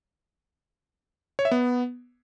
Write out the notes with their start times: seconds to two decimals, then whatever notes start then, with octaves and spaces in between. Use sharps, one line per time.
1.39 C#5
1.45 E5
1.51 B3